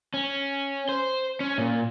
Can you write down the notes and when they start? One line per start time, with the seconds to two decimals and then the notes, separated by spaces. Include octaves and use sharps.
0.14 C#4
0.89 C5
1.40 C#4
1.58 A#2